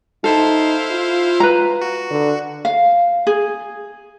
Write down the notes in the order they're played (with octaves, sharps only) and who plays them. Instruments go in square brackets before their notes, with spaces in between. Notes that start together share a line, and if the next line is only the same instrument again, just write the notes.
[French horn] D#4 [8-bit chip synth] E4 C5 F5 [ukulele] A4
[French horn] F4
[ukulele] B4 A#5
[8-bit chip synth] F#4
[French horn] D3
[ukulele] F5
G#4